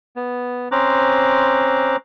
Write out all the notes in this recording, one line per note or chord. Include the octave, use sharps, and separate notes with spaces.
B3
C4 C#4 C5 A#5 D6 F#6